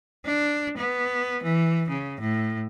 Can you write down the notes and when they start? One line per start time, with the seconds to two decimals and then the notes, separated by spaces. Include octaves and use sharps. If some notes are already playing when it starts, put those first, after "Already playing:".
0.25 D4
0.77 B3
1.43 E3
1.89 C#3
2.20 A2